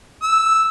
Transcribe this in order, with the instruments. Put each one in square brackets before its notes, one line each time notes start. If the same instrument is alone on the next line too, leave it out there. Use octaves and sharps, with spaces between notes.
[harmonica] E6